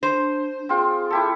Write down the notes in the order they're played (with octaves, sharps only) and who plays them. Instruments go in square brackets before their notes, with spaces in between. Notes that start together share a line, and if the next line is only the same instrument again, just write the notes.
[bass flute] D4 [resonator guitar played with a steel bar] C5
[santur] C4 F4 [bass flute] G#4
[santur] E4 G4 A4